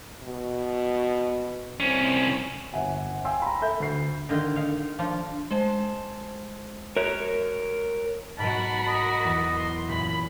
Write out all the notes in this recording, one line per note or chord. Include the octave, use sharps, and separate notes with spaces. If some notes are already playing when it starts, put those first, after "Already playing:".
B2
C2 C4 C#4
G1 E5 F#5 G#5
F5 G5 G#5 C6 E6
A#5 B5
A4 E5 B5 G6
D2 C7
D3 D#3 F4 C6
D#3 F5
F3 D4 F4
G#3 C5 A5
A#4 C#5
G#2 B2 F#3 F#4 A#4 A5 B5
D#5
E2 A6 B6
C6
F#2 A#2 B5